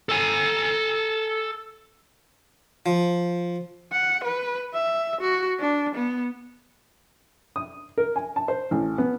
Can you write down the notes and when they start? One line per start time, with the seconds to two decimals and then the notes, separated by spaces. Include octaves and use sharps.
0.09 A4 G#5
2.86 F3
3.92 F#5
4.24 B4
4.74 E5
5.21 F#4
5.59 D4
5.95 B3
7.56 D#6
7.98 A#4
8.16 G#5
8.36 A5
8.48 C5
8.71 A1
8.98 B3